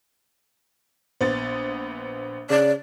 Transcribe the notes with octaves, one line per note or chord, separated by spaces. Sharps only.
A#1 B3 C5 A6
C#3 D5